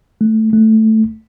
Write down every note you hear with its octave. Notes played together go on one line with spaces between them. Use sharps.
A3
A3